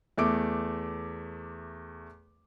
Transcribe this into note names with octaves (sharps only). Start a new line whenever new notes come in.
E2 A3 D6 D7